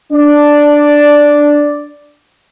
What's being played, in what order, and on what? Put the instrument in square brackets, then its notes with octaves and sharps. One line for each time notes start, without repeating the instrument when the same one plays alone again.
[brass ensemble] D4 D5